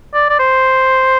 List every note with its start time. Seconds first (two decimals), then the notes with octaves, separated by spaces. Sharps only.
0.14 D5
0.30 D5
0.39 C5